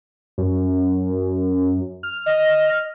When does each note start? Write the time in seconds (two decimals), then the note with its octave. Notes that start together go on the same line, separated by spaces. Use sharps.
0.38 F#2
2.03 F6
2.26 D#5